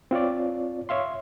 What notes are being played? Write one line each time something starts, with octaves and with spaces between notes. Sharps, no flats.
C4 F4 C#5 D5
C#5 E5 F5 C6